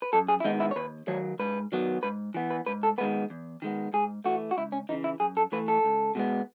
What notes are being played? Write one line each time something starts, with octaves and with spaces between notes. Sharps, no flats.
B4
F#2 A4
G#4
E4
D#3 G#3 B3 D#4
E4
C#5
D#2 B4
D#3 F#3 C#5
G#2 B4
D#3 F#3 B3
G#2 B4
E3 B3
B4
G#2 B4
A4
D#3 G#3 B3 B4
E2
D#3 G#3 B3
G#2 G#4
E3 A3 F#4
F#4
C#2 E4
C#4
C#3 E3 D#4
E4
F#2 G#4
A4
E3 A3 B4
A4
C#2
B2 G#3 B3